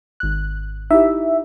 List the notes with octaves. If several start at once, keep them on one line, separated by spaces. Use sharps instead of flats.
G#1 F#6
D#4 E4 G4 E5